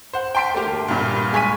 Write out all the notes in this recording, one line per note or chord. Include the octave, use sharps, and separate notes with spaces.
C5 F#5
G5 A5 C6 B6 D7
A3 A#3 G4
G1
C2 G2 A#2
G#3 G#5 C#6 B6 D#7